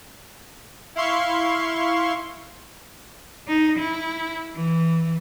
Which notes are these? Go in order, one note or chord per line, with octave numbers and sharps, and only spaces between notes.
E4 F5 C6 C#6
D#4
E4
E3